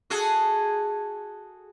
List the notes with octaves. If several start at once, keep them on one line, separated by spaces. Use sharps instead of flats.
F#4 G#4 A4